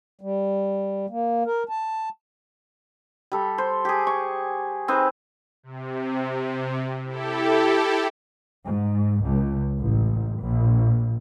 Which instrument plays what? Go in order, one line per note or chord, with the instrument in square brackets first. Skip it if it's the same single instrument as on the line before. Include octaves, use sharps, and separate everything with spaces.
[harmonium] G3
A#3
A#4
A5
[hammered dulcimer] G3 A4
C5
G4 G#4
C#6
C4 D#4 G#4 B4
[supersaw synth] C3
E4 G4 A4
[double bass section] G#2
C#2
A1
A#1